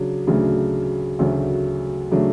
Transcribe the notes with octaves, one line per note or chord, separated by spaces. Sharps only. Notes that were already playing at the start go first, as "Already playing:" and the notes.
Already playing: C#3 F#3 D4
D2 C#3 F#3 A3 D4
D2 C#3 F#3 A3 D4
C#3 F#3 A3 D4